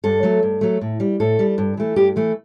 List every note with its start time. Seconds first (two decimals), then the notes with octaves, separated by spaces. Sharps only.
0.04 G2 A4
0.23 F#3 A3
0.43 G2
0.61 F#3 A3
0.81 A2
1.00 G3
1.20 A2 A4
1.39 G3
1.58 G2
1.77 E3 A3
1.96 G2 G4
2.16 E3 A3